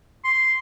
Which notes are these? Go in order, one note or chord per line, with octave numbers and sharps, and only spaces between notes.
C6